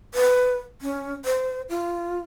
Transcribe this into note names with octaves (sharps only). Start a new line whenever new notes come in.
B4
C#4
C5
F4